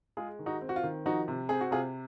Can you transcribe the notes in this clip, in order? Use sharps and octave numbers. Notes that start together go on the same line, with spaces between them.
G#3 F4 G#4
D#3
D#4 F#4
C4
F#4
F4
D#3
F3 D#4 F#4
C3
C4 G#4
F#4
C3 F4 G#4